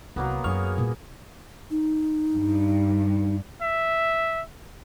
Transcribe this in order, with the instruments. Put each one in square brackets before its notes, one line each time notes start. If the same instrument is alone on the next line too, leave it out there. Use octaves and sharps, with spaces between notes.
[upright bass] C2 [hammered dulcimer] F#3 A#3 B3
[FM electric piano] F#2 F6 [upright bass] D#4 [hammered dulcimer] G#4 C#6
[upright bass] G2 A#2
[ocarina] D#4
[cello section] G2
[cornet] E5